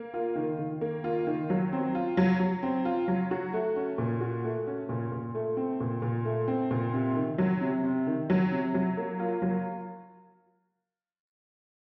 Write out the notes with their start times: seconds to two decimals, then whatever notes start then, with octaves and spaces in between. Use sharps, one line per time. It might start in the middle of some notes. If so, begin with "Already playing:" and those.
Already playing: A#3
0.14 F4
0.35 D#3
0.59 D#3
0.81 A#3
1.04 F4
1.27 D#3
1.50 F#3
1.73 C4
1.95 F4
2.17 F#3
2.39 F#3
2.63 C4
2.85 F4
3.08 F#3
3.31 F#4
3.53 A3
3.76 C#4
3.98 A#2
4.21 F#4
4.44 A3
4.67 C#4
4.89 A#2
5.12 A#2
5.35 A3
5.57 C4
5.80 A#2
6.02 A#2
6.25 A3
6.48 C4
6.71 A#2
6.93 C3
7.16 D#3
7.38 F#3
7.61 C3
7.84 C3
8.07 D#3
8.30 F#3
8.52 C3
8.74 F#3
8.97 A#3
9.19 F4
9.42 F#3